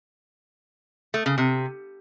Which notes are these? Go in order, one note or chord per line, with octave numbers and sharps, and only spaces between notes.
A3
C#3
C3